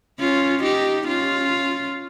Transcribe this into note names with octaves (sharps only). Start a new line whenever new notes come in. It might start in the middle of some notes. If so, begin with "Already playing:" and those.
C#4 F4
D#4 G4
C#4 F4